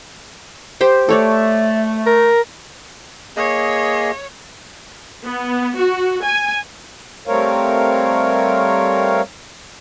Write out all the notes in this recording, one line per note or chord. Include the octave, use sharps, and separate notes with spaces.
G4 C5 G5
A3 A4 C#5 D5
A#4
A#3 G#4 C#5 D#5
B3
F#4
G#5
G3 A3 C4 A#4 C#5 F5